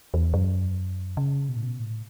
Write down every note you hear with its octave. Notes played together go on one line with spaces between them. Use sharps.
E2
F#2
C#3
B2
A2
B2
A2